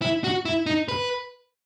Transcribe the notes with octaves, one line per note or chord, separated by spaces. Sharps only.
E4
F#4
E4
D#4
B4